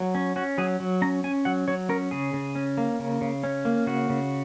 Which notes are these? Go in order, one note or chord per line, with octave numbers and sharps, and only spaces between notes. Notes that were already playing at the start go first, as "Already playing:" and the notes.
Already playing: F#3
C#4
C#4 F#4
F#3 G#4
F#3
C#4 A#5
C#4 G#5
F#3 F#5
F#3 C#5
C#4 A#4
C#3 G#4
C#3
C#4
A#3
C#3
C#3
C#4
A#3
C#3 F#4
C#3